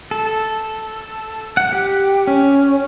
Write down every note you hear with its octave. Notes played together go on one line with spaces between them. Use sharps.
A4
F#5
G4
C#4